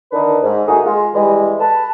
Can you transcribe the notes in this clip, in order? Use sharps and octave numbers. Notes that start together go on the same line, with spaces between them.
D3 D#3 D4 D#4 A#4 B4
G#2
D#3 A3 A#3 D#4 F#4 G#4
G#3 F4
E3 G3 G#3
B4 A5